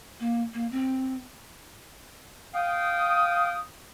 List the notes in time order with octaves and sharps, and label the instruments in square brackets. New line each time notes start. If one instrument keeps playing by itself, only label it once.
[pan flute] A#3
A#3
C4
[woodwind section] F5 G5 D#6